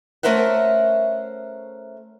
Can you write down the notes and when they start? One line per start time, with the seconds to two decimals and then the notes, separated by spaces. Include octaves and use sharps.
0.23 A3 C#4 A#4 C5 E5 F#5